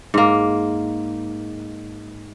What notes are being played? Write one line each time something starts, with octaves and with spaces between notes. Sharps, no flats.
G#2 A#3